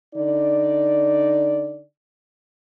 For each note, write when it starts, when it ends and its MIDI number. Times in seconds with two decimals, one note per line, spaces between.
0.16 1.82 50
0.16 1.82 63
0.16 1.82 74